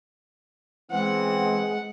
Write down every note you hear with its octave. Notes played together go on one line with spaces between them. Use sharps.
E3 G#3 B3 C4 F#5